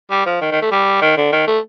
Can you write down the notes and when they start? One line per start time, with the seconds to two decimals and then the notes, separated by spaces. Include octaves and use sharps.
0.11 G3
0.26 F3
0.41 D#3
0.52 D#3
0.62 A3
0.71 G3
1.01 D#3
1.17 D3
1.32 D#3
1.47 A3